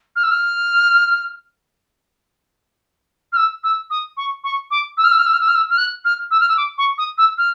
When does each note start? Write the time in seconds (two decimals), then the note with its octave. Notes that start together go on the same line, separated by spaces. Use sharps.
0.16 F6
0.23 E6
0.31 F6
3.32 F6
3.36 E6
3.63 E6
3.90 D#6
4.17 C#6
4.44 C#6
4.71 D6
4.97 E6
5.04 F6
5.12 E6
5.19 F6
5.26 E6
5.33 F6
5.41 E6
5.48 F6
5.55 E6
5.70 F6
5.78 F#6
6.05 F6
6.31 E6
6.40 F6
6.49 E6
6.57 D6
6.78 C#6
6.98 D#6
7.18 E6
7.38 F6